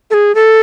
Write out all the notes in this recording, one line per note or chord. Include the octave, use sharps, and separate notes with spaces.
A4
G#4
A4